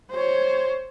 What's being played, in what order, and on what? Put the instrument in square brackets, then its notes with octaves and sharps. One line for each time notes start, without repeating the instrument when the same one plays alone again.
[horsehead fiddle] C5 C#5